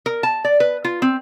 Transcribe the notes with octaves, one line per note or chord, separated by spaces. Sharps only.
A#4
A5
D5
B4
F4
C4